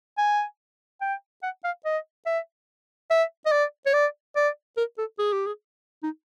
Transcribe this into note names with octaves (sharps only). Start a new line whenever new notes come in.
G#5
G5
F#5
F5
D#5
E5
E5
D#5
D5
C#5
D5
D5
A#4
A4
G#4
G4
G#4
D#4